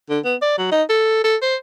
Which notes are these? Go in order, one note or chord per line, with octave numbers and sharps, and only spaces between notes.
D3
B3
D5
F#3
D#4
A4
A4
C5